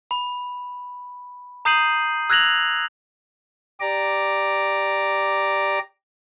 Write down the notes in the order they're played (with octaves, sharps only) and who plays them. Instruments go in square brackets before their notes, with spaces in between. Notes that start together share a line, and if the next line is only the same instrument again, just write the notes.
[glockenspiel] B5
A#5 D#6 G6 C7 D#7 F#7
E6 F#6 G#6 A#6 F7 F#7
[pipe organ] G4 D5 A#5 D6